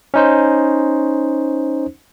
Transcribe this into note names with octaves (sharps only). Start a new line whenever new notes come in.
C#4 D#4 C5